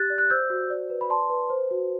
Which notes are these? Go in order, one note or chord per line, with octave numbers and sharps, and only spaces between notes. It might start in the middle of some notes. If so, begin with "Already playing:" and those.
Already playing: G4 F#6 A6
D5
F#6
C5 E6 G6
F#4
D5
B4
B5
D5 A5 C6
B4
C5
F#4